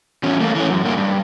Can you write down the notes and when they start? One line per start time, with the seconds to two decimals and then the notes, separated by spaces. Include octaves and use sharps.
0.23 E2 C#4
0.41 A3 A#3
0.55 E3 C#4
0.70 F#2
0.84 G2 A#3
0.98 G2